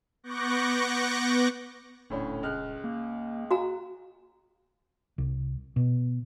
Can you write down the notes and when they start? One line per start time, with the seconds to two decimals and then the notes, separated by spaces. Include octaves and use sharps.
0.23 B3 C#6 D6 F#6 G6 A#6
2.10 D#1 D2 A2 C#4
2.43 C#2 F6 F#6
2.84 A#3
3.51 F#4 F5 A#5
5.18 C2
5.76 B2